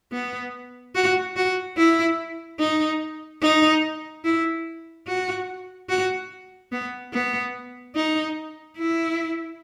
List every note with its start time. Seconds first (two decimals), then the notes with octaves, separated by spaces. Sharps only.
0.12 B3
0.95 F#4
1.36 F#4
1.77 E4
2.60 D#4
3.42 D#4
4.25 E4
5.07 F#4
5.89 F#4
6.72 B3
7.13 B3
7.96 D#4
8.78 E4